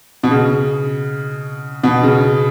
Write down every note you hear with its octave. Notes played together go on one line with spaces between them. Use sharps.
B2
C#3
B2
C#3